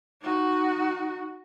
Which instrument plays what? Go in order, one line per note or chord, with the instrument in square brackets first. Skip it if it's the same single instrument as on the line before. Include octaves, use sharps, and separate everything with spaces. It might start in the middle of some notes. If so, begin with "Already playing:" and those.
[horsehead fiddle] D#4 F#4